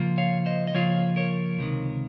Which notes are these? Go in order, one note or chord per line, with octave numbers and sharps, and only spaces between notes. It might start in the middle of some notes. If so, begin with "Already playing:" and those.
Already playing: C#3 F3 A#3 F4
C#5 F5
C5 D#5
D#5
C#3 F3 A#3 F4 C#5 F5
A#4 C#5
C#2 C3 D#3